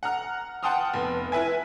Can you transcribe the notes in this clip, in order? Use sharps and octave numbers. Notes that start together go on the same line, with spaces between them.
F#5 A#5 F6
F#5 G5 A5 C6 D#6 F6
F1 B3
E4 B4 E5 G#5